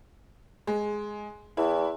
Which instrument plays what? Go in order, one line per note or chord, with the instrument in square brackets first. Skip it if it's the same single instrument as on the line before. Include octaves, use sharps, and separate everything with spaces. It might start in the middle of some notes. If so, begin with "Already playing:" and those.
[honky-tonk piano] G#3
[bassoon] E2 [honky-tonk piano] E4